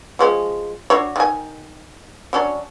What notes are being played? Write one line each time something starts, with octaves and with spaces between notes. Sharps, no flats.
F3 G#3 C#4
D4 F#4 C#5
D#3 G#5
F#3 C#4 D4